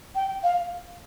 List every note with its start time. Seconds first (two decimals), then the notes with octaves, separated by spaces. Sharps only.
0.15 G5
0.43 F5